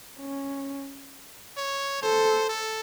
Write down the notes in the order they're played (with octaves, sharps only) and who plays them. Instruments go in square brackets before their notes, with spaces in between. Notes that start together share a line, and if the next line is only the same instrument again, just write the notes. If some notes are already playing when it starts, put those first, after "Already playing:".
[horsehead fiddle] C#4
[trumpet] C#5
[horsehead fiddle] A4 [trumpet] C5
[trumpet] A4